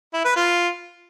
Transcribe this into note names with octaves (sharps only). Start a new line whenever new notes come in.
E4
B4
F4